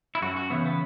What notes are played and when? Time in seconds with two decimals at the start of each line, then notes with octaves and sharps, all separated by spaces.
0.15 E4
0.22 F#2 F#4
0.36 F#4
0.50 C#3 E3 B3 E4
0.65 B3